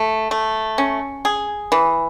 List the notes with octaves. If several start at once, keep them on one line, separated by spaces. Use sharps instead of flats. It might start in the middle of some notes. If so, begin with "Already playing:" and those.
Already playing: A3
A3
C#4
G#4
E3